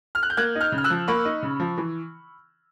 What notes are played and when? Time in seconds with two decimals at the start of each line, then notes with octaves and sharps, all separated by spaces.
0.15 F6
0.23 F#6
0.30 G6
0.37 A#3 F#6 G#6
0.55 D#4
0.61 F6 G6
0.72 C#3
0.78 F6
0.84 E6 F#6
0.90 F3
1.08 A#3 B5 C#6
1.25 D#4
1.43 C#3
1.60 F3
1.78 E3